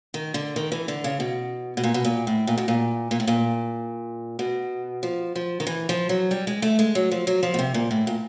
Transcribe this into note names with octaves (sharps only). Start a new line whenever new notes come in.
D#3
D3
D#3
E3
D3
C#3
B2
B2
A#2
B2
A#2
A2
A#2
B2
A#2
A#2
A2
A#2
B2
F3
F3
D#3
E3
F3
F#3
G3
G#3
A3
G#3
F#3
F3
F#3
F3
B2
C3
A#2
A2
A#2